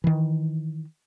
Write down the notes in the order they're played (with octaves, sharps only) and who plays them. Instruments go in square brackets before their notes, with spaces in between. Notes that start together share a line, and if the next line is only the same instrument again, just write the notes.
[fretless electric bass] D#3 E3